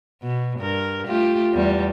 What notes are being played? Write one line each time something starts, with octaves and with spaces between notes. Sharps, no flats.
B2
G2 A#4
A3 F4 G4
E2 G3 B3